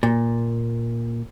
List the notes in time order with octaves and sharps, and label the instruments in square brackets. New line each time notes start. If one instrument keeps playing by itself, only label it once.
[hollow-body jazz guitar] A#2